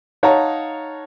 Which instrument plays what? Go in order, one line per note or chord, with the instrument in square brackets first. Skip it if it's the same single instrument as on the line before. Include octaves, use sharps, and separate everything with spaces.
[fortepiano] D#4 C#5 F5 F#5 A5 A#5